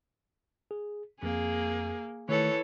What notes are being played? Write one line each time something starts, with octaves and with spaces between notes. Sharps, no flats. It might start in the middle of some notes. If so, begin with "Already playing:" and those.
G#4
F2 A#3 G#4
D#3 E3 A3 A4 C#5